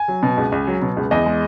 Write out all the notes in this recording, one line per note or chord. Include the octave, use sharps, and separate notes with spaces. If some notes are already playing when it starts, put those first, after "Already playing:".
Already playing: G#5
F#3
B2
C#2
C#2
F#3
B2
C#2
E2 D#5
G#3